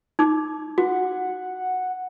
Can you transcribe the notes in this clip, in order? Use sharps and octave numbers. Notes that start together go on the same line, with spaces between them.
D#4 D6
F#4 F#5